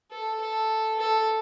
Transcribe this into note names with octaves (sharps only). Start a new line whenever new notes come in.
A4
A4
A4